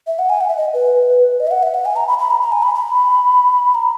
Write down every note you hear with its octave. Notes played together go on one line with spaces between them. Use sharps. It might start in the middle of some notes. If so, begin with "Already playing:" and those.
E5
F#5
G#5
F#5
E5
D#5
B4
D#5
E5
F#5
E5
F#5
G#5
A#5
B5
B5
A#5
A#5
G#5
B5
B5
A#5